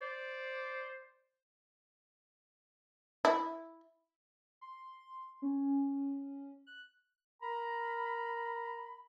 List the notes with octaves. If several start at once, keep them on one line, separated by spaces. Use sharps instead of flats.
C5 D5
E4
C6
C#4
F#6
A#4 A#5 B5